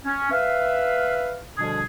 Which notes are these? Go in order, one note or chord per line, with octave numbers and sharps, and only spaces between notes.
C#4
B4 E5 F5
B2 D3 F3 G3 D4 G#4